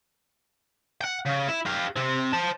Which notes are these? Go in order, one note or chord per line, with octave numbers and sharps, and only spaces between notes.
F#5 G5
C#3
E4
G4 F5
C3 C4
C5 A5